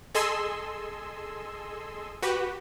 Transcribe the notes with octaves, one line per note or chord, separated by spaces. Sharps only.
G#4 A4 D#5 G#5 C6 E6
F#4 G4 B4